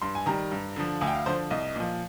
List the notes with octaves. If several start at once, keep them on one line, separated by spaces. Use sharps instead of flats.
G2 C6
G#5
D#3 G3 A#5
G2
D3 F3
D2 G#5
G5
F5
D3 F3 C5
C2 D#5
A#2 F3